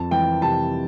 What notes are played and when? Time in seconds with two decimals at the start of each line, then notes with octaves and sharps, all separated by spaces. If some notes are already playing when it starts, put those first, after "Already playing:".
Already playing: F2 A5
0.11 E3 G5
0.42 C3 A5